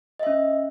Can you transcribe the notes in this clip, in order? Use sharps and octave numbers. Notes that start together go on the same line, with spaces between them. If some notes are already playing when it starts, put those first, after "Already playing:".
C#4 D#5 E5